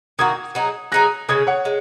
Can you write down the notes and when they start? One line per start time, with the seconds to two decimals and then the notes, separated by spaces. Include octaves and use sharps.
0.19 D#3 A#3 F#4 D#6 G#6
0.55 F#3 D#4 G#4
0.92 F#3 D#4 G#4 F#6 A#6
1.29 C#3 G#3 C#4 D#6 G#6
1.47 C#5 F#5
1.65 G#3